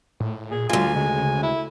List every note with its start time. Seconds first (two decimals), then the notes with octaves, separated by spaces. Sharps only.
0.20 A2
0.51 A#2 G#4
0.70 D2 G#2 G3 F4 G#5
0.95 C#3 G#3
1.43 E4